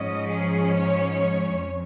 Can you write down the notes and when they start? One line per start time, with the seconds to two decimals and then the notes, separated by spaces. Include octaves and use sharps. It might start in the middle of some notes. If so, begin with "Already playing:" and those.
Already playing: G#2 F3 C#4 D#5
0.30 G#4
0.72 C#5
1.55 F2